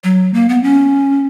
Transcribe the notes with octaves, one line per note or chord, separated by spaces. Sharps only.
F#3
A#3
B3
C#4